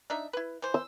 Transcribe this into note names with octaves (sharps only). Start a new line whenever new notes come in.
D4 D#4 E5
E4 B4
E3 C5
E6